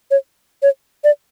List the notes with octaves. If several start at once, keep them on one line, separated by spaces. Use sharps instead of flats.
C#5
C#5
D5